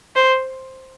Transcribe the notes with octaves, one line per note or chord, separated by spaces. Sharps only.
C5